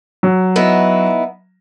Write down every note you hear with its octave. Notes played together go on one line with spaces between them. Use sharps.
F#3
B3 D#4 E4